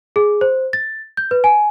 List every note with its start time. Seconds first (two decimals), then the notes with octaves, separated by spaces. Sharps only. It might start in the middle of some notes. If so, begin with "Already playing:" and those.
0.16 G#4
0.41 C5
0.73 A6
1.17 G6
1.31 B4
1.44 G#5